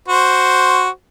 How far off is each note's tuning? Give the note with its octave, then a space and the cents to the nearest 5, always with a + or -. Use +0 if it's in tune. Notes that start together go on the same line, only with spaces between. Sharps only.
F#4 +0 C5 +0